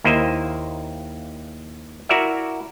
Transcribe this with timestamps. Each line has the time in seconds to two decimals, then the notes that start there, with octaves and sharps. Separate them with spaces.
0.04 D#2 A#3 E4 C5 D#5 E5
2.09 E4 F#4 A#4 D5 E5